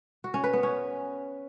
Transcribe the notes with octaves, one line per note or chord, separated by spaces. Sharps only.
F#4
C#4
B4
B3
C#4